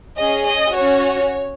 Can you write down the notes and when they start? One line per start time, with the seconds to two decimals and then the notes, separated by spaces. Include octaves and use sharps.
0.18 C#4 G#4 D#5
0.46 D#5
0.74 C#4 F#4 C#5